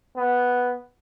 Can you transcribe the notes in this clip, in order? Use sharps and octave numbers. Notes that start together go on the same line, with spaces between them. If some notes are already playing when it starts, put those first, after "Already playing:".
B3